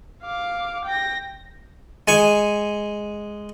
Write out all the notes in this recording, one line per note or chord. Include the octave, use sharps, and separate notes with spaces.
F5 D6
G5 A#6
G#3 G#5 C#6